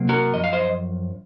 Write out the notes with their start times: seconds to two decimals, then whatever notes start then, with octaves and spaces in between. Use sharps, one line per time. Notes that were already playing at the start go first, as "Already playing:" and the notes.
Already playing: C3 F#3 A#3
0.09 F#4 A#4
0.34 F#2 F3 D#5
0.44 F5
0.53 C5 D#5